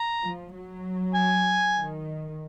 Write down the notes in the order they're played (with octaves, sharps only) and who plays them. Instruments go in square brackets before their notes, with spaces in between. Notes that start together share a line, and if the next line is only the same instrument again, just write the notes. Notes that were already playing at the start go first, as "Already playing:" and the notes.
Already playing: [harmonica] A#5
[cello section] F3
F#3
[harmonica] G#5
[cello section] D#3